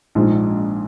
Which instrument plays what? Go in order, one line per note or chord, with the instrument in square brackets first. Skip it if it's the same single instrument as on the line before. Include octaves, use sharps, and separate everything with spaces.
[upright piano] A#1 G#2 F3 G#3